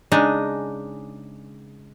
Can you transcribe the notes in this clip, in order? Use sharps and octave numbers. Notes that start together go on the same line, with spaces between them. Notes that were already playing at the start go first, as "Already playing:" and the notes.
C#3 G#3 D4 D#4